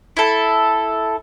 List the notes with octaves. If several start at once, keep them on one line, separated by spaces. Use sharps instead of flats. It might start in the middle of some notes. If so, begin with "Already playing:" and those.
E4 A4